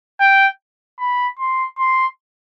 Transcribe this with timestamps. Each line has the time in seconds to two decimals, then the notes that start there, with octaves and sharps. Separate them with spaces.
0.20 G5
0.99 B5
1.39 C6
1.79 C6